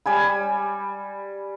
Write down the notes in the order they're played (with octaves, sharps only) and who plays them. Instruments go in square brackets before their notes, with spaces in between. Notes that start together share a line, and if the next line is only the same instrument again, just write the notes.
[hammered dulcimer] G3 G#5 B5